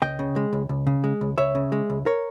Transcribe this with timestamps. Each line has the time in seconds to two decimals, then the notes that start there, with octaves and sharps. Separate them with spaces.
0.02 C#2 D#5 G5
0.19 C#3
0.36 G#3
0.53 C#2
0.69 C#2
0.87 C#3
1.04 G#3
1.21 C#2
1.38 C#2 C#5 E5
1.55 C#3
1.72 G#3
1.90 C#2
2.06 A#4 C#5